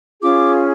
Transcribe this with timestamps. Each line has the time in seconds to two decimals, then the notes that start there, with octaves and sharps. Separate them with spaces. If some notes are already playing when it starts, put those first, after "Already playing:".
0.21 C#4 F4 G#4 D6